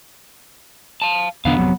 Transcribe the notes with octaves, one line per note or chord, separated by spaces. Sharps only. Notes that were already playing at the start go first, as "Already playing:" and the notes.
F5 A5
B1 E2 D3 B3 D4 F5
G#1 F2 C3 F#3